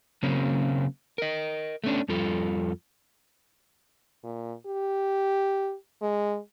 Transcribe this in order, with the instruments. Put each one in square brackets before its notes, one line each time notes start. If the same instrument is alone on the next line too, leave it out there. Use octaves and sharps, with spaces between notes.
[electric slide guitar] C#3 F#3 A#3 C4 C#4
A#4 D#5
A3 B3 C#4 D4
F2 G3 F4 A4
[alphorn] A#2
G4
G#3